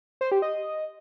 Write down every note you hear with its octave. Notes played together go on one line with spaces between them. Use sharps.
C5
G4
D#5